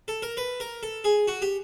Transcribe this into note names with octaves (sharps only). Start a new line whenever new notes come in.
A4
A#4
B4
A#4
A4
G#4
F#4
G4